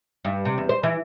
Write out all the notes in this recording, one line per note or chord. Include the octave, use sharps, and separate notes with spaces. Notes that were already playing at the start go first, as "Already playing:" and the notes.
G2
C3
E2
C5
E3